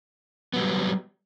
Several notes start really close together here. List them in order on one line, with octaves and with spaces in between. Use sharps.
B3 F#3 G3